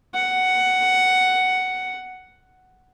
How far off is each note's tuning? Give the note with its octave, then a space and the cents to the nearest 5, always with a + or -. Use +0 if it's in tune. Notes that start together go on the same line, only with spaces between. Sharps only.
F#5 +10